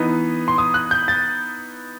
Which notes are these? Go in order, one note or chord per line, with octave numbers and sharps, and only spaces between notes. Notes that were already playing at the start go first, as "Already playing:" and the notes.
Already playing: E3 B3 D#4
C6
D#6
F#6
G6
A6